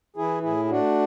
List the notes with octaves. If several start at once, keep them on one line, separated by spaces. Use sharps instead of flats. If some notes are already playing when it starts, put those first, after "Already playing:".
E3 E4 G#4
A2 E4 G#4
G#4
A3 D4 F#4